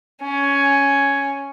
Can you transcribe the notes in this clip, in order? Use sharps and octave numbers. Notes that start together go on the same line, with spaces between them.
C#4